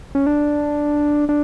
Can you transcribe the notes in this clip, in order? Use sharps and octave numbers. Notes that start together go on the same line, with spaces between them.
C#4
D4
D4